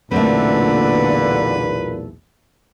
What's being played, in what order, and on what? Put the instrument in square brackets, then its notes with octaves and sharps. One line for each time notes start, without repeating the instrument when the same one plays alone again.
[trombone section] B1 E2 A#2 [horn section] D3 [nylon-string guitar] A3 A#3 C4 [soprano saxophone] B4